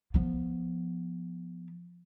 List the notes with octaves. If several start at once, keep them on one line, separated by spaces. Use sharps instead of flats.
F3 B3